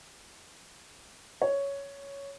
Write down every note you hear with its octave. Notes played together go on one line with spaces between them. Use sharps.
C#5